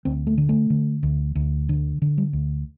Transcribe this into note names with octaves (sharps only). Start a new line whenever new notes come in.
D2 C4
A3
D3
A3
D3
D2
D2
D3
D3
G3
D2